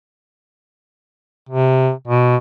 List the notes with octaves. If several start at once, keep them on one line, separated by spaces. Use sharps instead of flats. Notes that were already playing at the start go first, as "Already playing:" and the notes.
C3
B2